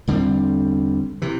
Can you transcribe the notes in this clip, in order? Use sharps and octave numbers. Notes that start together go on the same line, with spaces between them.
E2 D3 G3 C4
C3 E3